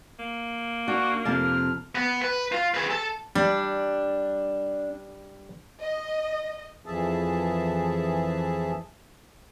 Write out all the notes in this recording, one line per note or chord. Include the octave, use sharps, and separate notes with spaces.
A#3
D4 F#4
F2 C3 A5 F6
B3
B4
F4
G#4 B4
A4 A5
G3 D4
D#5
F2 E3 F3 G#4 E5 A5